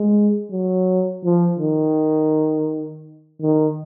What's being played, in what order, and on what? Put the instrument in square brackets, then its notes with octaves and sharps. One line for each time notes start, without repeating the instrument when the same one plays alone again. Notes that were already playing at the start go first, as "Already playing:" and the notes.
Already playing: [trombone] G#3
F#3
F3
D#3
D#3